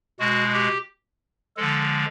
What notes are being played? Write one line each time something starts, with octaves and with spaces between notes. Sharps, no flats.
B2 G#3 F#4
G4
D3 F3 G#3 A4